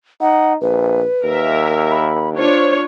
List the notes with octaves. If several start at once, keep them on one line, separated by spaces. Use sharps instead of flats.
D#4 F#5
A#1 B4
D#2 A#4 E5
B5
D4 F4 C5 C#5